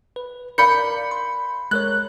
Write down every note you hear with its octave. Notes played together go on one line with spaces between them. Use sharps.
B4
A#4 D5 F5 B5 G6 C#7
C6
G#3 A#4 C#5 F#6